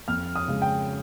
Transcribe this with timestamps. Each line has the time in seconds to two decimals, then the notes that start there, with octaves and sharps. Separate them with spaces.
0.08 F2 F6
0.36 D#6
0.48 C#3 G#3
0.62 G5